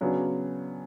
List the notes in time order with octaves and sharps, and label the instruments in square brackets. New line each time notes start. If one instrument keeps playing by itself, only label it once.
[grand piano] C#3 F#3 B3 D4 F#4